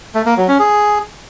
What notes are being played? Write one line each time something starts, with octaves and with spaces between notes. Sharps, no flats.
A3
A#3
F#3
C#4
G#4